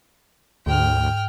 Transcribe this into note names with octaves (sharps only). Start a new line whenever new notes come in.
D2 G#2 G5 F6